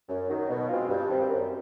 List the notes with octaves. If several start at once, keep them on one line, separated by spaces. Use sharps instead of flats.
F#2
D#3 F#3
B2
G#3 C4 F4
G2
D#3 G3 C4
F#2